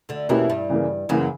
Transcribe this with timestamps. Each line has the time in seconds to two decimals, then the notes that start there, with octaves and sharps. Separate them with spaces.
0.09 D2 D3
0.29 E2 B2 E3 A#3 C#4 E4 G4
0.50 G2 G3
0.69 C#3 E3 A#3
1.09 F#2 C#3 E3 F#3 A#3